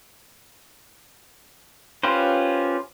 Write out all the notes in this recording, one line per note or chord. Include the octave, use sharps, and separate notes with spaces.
C#4 F4 G4 B4 C5